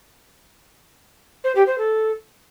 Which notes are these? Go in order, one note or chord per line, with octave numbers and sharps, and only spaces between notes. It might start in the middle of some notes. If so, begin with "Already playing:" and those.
C5
G4
C5
A4